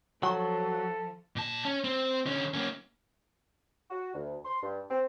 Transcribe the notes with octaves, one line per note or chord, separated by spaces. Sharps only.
F3 F#3 A4 F#5 A#5 C#6
A#2 A5
C#4
C4
D3 C#4
A#3 C#4
F#4
D2
C6
G2
C4